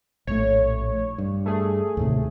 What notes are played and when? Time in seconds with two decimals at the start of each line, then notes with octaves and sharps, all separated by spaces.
0.27 A#1 A2 A3 C#5
1.18 G2
1.46 A3 G#4
1.97 D#2 A2 C3